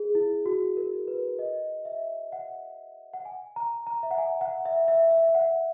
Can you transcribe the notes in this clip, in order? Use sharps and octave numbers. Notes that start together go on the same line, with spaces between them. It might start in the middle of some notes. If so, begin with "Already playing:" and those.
Already playing: G#4
E4
F#4
A#4
B4
D#5
E5
F#5
F#5
G#5
A#5
A#5
E5
F#5
G#5
F#5
E5
E5
E5
E5
F#5